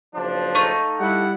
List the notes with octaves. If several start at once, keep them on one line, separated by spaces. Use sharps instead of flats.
F#1 F3 D4
A3 D#4 F4
G3 E4 F#5